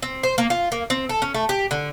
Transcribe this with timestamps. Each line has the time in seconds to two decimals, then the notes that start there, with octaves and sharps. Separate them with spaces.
0.02 C4
0.23 C5
0.38 A#3
0.50 F4
0.72 A#3
0.90 C4
1.09 A4
1.22 C#4
1.34 A3
1.49 G4
1.71 D3